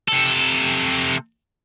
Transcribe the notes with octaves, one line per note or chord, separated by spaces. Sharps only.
C3 A4